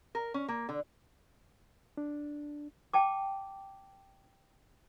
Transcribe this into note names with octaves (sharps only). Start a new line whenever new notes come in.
A#4
C#4
A#3
D3
D4
G5 A5 D6